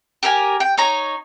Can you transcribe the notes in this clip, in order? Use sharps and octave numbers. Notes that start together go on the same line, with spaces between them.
G4 A#4 G5 G#5
G5
D#4 C#5 A#5